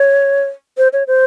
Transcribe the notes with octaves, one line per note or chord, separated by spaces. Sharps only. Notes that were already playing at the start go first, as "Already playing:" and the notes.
Already playing: C#5
C5
C#5
C5